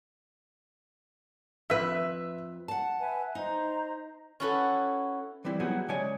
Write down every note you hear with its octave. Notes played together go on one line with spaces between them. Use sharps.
F2 B4 E5 B6
F#5 A5
B4 E5 G#5
D#4 C5 D#5 A#5
C#4 E4 F#4 A4 B4
E3 G3 C4 E4
F#3 G3 B3 E4 F#4 G#4
C#3 G#3 C#5 D5 G#5